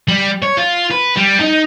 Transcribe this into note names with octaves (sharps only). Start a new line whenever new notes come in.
G3
C#5
F4
B4
G3
D#4